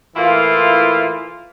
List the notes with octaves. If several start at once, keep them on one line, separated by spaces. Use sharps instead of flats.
A2 E3 A#3 E4 F4 F5